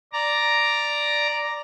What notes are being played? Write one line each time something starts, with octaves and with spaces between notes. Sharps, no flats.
D5 A#5